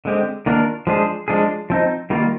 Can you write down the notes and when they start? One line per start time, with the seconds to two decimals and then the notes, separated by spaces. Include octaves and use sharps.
0.05 D3 G#3 C4 G4
0.46 D#3 A#3 D4 F4 A#4
0.87 F3 G#3 D4 G#4 C5
1.28 F3 G#3 D4 G#4
1.70 F3 C4 D#4
2.10 D#3 G3 A#3 F4